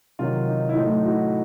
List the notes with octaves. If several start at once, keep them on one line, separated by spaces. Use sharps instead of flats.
C3 D#3 F#3 F4 G4
D#4
E4
A2 F#3 A3 D#4 F4
E4 F#4